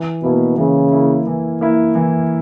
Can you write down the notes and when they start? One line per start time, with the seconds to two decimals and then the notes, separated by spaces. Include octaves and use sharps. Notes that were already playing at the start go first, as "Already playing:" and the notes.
Already playing: E3
0.23 B2 A#3 E4
0.58 C#3 E3
0.92 A#3 E4
1.27 E3
1.61 A#3 E4
1.95 E3